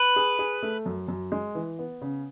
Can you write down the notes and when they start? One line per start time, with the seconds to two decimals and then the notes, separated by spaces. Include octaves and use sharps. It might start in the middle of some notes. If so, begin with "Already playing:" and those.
Already playing: B4
0.16 G#4
0.39 G#4
0.63 A3
0.86 F#2
1.08 F#2
1.32 G#3
1.55 E3
1.79 B3
2.02 C#3